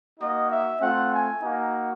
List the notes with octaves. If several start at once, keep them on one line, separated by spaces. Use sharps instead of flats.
A#3 D#4 F#4 D#5
E5
A3 C4 F4 F#5
G#5
A#3 D#4 F#4